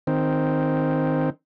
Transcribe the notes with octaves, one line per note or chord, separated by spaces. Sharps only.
D#3 C4